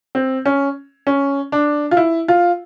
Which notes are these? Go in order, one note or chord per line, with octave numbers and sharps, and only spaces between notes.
C4
C#4
C#4
D4
F4
E4
F4